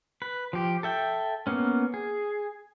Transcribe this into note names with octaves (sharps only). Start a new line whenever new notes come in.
B4
F3 G4
A4 E5 G5
A#3 B3 C#4
G#4